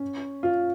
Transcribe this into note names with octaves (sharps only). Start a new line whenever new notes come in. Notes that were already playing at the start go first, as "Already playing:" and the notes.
Already playing: C#4
F4